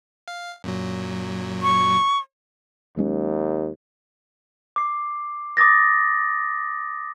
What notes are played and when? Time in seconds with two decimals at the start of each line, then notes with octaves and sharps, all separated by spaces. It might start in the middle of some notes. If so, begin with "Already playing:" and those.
0.28 F5
0.64 F#2 A#2 F#3
1.62 C#6
2.97 D#2 F#3 G#3 C#4
4.76 D6 C7
5.57 D6 D#6 A6 A#6